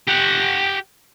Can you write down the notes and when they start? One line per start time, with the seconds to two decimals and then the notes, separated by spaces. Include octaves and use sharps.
0.08 G4 F#5